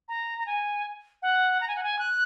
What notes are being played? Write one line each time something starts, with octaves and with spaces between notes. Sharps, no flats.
A#5
A#5
G#5
F#5
A#5
G#5
F#5
G#5
F#6